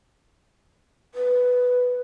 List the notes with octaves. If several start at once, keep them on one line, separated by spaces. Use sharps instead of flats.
B4